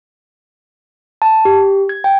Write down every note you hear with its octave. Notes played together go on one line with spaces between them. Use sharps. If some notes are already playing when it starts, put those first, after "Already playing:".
A5
G4
G#6
G5